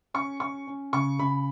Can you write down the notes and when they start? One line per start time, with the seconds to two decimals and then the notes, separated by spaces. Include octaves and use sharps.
0.14 C#4 C#6
0.40 C#4 C#6
0.67 C#4
0.93 C#3 C#6
1.19 C#3 B5